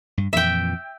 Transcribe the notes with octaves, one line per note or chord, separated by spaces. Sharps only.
G2
F2 A#2 E3 E5 G5